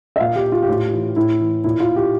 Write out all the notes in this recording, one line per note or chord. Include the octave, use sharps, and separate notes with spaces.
E5
A#2 F5
G4
F4
G4
A2 F4
E3
A2 E4
E3
A#2 E4
F4
G4